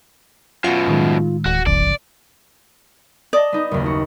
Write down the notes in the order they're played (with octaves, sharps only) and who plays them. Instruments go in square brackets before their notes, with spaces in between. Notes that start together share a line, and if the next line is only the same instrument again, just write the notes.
[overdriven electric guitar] F#2 B2 [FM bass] F4 [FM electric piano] F#5 C#7
[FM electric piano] A2 D#3 G#3
[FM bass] D1 [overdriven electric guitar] F#4
[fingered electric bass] G1 C#2 F3 [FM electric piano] C#3 [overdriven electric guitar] D5
[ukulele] D5 [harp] D#5 A5 D#6
[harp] B3 D#4
F#1 D#2
F#4